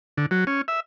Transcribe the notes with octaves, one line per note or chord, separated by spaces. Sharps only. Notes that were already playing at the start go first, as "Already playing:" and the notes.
D3
F#3
C#4
E5